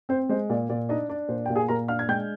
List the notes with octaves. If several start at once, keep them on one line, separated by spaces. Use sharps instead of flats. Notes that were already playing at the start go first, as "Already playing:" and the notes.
C4 C5
G#3 C5
A#2 D5
A#2 D5
D4 D#4 D#5
D4 D5
A#2 C5
A#2 G5
G#4 G#5
A#2 A#4 A#5
D4 F5 F6
G#6
G#3 G5 G6